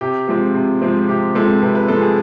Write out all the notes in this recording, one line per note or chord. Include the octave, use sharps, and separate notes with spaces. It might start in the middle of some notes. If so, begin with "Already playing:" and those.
C3 G4
F3 G#3 C4
C3
F3 G#3 C4
C3 G4
F3 G#3 C4 A4
C3 B4
B4
F3 G#3 C4 A4
G#4